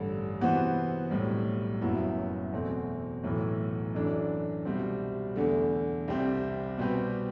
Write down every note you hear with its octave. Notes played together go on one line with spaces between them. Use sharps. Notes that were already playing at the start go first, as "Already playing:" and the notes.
Already playing: A1 G2 D3
C3 E3 B3 F#4 C5
B1 A2 G3
F#1 F#2 F#3 B3 E4
E2 B2 A3 C4
B1 A2 E3 A3
F#2 E3 A3 D4
C2 B2 G3 C4
E2 D3 A3
C2 C3 G3 C4 G4
B2 G3 C4 G4 B4